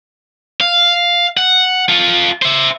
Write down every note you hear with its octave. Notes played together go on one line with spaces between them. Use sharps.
F5
F#5
F4 A4
C5 E5